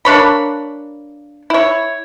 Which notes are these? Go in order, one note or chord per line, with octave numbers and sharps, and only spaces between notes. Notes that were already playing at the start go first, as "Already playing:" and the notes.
A#3 D4 C#5 B5
E4 C#5